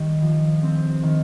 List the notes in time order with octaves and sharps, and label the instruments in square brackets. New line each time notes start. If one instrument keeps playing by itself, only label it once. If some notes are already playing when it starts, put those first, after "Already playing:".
Already playing: [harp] D#3 G3
F3
C4
D#3